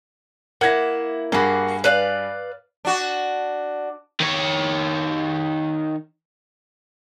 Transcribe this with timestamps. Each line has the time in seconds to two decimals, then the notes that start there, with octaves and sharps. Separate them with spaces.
0.61 A#3 E4 F#5 G#6 A#6
1.32 G2 A#3 F#4 G#4 B5
1.84 B4 D5 F5
2.85 D4 F#4
4.20 D#3 C#5